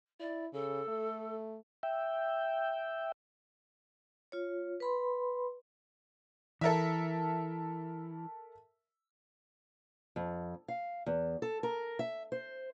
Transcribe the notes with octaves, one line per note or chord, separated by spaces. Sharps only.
E4 D5
C#3 A4
A3
E5 G5
F4 C#5
B4 B5 C6
E3 A4 A#4 E5
F2
F5
E2
A4
A#4
E5
C5